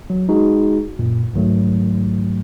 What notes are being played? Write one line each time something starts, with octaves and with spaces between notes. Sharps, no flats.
F#3
G#3 D#4 F#4 G#4
F#2 A#2
C2 G#2 D#3 F#3 A3